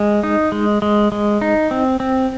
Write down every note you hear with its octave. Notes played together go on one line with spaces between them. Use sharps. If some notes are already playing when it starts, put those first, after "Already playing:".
Already playing: G#3
D#4
G#3
G#3
G#3
D#4
C4
C4